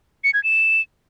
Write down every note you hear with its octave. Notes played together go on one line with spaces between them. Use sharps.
C#7
G#6
E7